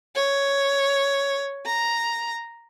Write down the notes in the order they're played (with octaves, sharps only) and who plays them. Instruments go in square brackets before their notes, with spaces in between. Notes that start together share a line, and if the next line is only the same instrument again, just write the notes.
[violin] C#5
A#5